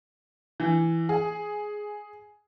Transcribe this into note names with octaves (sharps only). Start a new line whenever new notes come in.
E3
G#4